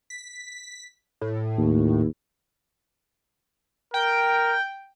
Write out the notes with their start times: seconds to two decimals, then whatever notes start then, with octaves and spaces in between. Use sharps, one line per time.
0.10 B6
1.21 A2
1.58 D#2
3.94 A#4 G5